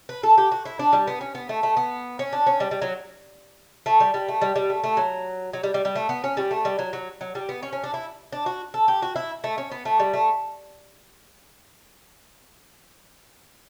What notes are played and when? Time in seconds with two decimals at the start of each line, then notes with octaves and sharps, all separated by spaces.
0.09 B4
0.23 A4
0.38 G4
0.52 F#4
0.65 E4
0.79 D4
0.93 G3
1.08 B3
1.21 C#4
1.35 B3
1.49 A3
1.63 A3
1.77 B3
2.19 C#4
2.33 D4
2.47 C#4
2.60 G3
2.71 G3
2.82 F#3
3.86 A3
4.00 G3
4.14 G3
4.28 A3
4.42 G3
4.56 G3
4.70 A3
4.84 A3
4.97 F#3
5.53 F#3
5.63 G3
5.74 G3
5.85 G3
5.96 A3
6.09 B3
6.24 C#4
6.37 G3
6.51 A3
6.65 G3
6.79 F#3
6.93 F#3
7.21 F#3
7.35 G3
7.49 B3
7.63 C#4
7.73 C#4
7.84 D4
7.94 E4
8.33 D4
8.46 F#4
8.74 A4
8.88 G4
9.02 F#4
9.16 E4
9.44 A3
9.58 C#4
9.72 B3
9.85 A3
10.00 G3
10.14 A3